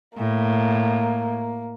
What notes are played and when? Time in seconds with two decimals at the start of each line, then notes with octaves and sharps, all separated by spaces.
0.18 A2 A#3